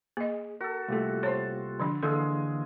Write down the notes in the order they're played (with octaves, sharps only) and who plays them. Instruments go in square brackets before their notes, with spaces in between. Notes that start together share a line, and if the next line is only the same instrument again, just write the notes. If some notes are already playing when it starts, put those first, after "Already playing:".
[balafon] A#3 D#5 [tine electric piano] G#4
[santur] F#4 A4 [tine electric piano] A#4
[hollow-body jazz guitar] C2 A3 [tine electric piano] A#3 F4 G4
[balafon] C5 C#5 [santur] A5 C6
[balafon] D3 F3 D4
[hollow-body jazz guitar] D3 [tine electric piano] E3 A#3 F5 [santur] G#3 G#4 E6 [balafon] A4